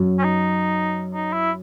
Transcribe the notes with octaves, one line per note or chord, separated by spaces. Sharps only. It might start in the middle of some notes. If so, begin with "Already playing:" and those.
Already playing: F#2 F#3
C#4
D#4
D#4
E4